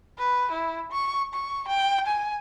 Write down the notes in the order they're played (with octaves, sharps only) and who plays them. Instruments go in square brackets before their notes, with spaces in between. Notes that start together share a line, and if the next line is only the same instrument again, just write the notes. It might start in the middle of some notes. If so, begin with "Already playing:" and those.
[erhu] B4
E4
C#6
C#6
G5
G#5